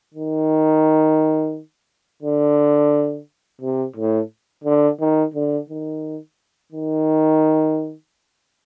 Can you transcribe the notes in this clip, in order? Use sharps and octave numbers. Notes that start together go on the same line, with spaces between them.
D#3
D3
C3
A2
D3
D#3
D3
D#3
D#3